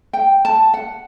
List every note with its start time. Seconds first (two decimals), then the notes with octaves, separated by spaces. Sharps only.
0.13 G5
0.45 A5
0.74 F#5